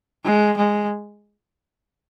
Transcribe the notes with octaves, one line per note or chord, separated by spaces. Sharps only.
G#3
G#3